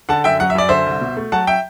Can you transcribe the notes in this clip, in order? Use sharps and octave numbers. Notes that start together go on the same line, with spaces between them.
D3 F#5 A5
F#2 E5 G5
F#3 F#5
E5
F#2 D5
D3 C5 E5
C2
B2
A3
F#3 F#5 A5
E5 G5